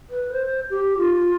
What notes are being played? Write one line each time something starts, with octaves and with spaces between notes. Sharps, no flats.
B4
C5
G4
F4